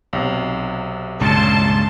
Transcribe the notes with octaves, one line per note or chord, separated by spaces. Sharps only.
B1 C3
C#2 G2 A#2 C#4 A5 C6